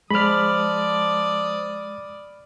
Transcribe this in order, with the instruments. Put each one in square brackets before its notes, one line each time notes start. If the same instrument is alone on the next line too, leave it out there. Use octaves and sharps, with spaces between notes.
[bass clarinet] F3 [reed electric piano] G#3 [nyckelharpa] D5 D#6 [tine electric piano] B5 F6